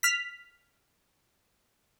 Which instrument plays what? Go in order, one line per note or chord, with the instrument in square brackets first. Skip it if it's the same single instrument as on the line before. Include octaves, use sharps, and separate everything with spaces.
[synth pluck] F6 B6